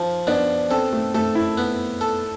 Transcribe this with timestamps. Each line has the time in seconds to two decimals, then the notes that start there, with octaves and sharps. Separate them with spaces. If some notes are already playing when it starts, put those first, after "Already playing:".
Already playing: F3 F4
0.27 B3 D4
0.70 C4 A4
0.93 A3
1.14 A3 A4
1.35 E4
1.57 B3
2.01 A4